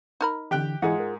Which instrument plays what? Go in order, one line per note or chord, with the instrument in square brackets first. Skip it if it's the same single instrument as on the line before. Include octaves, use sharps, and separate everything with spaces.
[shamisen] D#4 A#4 B5
[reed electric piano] D3 E3 [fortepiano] G4 G5 F#6
[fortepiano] G#2 [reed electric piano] E3 E4 [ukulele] F4 G#4 F#5
[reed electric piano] A#4